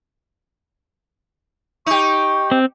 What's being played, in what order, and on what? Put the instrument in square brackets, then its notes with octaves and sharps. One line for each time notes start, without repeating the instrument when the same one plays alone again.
[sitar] D#4 G4 [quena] C#6
[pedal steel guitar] C4